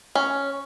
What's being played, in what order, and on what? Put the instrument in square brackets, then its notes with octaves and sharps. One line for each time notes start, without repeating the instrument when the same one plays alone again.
[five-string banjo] C#4